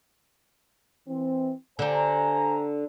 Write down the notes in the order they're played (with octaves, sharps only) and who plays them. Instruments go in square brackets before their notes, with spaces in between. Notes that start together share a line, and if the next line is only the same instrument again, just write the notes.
[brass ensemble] E3 C4
[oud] D3 G4 [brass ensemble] C5 G#5 A#5